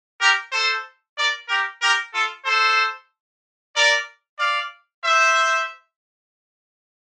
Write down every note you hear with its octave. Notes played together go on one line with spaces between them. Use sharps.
G4 A#4
A4 C5
A#4 D5
G4 A#4
G4 A#4
F4 A4
A4 C5
A#4 D5
D5 F5
C5 E5